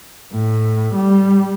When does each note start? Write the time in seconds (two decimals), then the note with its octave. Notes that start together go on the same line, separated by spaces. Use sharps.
0.32 A2
0.95 G3